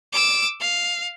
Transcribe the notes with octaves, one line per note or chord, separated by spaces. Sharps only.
D6 E6
F5